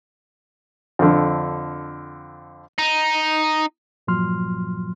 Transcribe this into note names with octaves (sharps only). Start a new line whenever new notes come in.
F2 D3
D#4
G2 A#2 F3 F#3 C6 F6